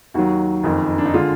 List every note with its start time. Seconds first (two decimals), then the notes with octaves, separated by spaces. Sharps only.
0.14 D#2 D#3 F#3 F#4
0.63 F#1 F2 D#3
0.98 D4
1.05 D#4
1.14 D3 G#3 F4